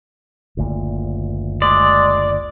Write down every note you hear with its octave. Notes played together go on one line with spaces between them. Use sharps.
F#1 D2 A#2
G#3 D5